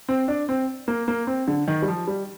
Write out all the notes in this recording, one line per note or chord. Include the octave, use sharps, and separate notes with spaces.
C4
D4
C4
A#3
A#3
C4
D3
D#3
G3
F3
G3